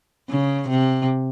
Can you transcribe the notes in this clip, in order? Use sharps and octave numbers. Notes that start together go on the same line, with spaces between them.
C#3
C3